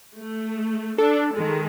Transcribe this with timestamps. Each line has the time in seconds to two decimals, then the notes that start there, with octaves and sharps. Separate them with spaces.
0.18 A3
0.98 D4 A4
1.33 D#3 G#3